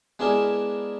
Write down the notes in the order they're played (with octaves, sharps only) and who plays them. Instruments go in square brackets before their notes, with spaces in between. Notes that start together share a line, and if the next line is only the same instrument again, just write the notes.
[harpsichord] G#3 B3 D4 E4 G#4 A#4